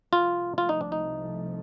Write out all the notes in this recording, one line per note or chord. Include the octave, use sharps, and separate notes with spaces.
C2 C3 F3 A3 F4
F4
D#4
D4
D#4